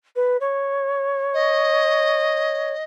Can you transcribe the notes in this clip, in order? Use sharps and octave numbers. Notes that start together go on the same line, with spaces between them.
B4
C#5
D#5